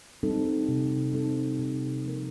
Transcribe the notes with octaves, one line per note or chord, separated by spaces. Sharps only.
G3 C4 D#4 A4
C3
G3 C4 D#4 A4
C3
F3 A#3 D#4 A#4